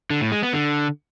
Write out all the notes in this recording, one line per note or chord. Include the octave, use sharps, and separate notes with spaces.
D3
A2
G#3
B3
D3